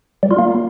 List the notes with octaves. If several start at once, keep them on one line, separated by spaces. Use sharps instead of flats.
G3
F4
A#3